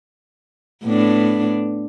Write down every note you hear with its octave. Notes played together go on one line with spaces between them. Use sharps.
A2 B3 D4